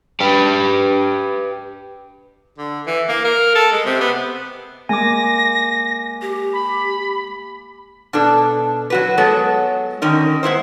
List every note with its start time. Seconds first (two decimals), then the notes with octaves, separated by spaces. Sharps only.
0.20 G4 B4
2.58 D3
2.87 E3
3.09 A#3
3.25 A#4
3.55 A4
3.72 G#3
3.86 C3
4.01 B3
4.89 G#3 A#3 G#5 D6 A#6
6.22 G4
6.53 B5
8.13 B2 D4 A4
8.90 F#3 F#4 B4
9.17 F#3 G#3 B3 A4 C#5
10.02 D3 D#3 C#4 D#4 A#4
10.43 G#2 B3 E4 C5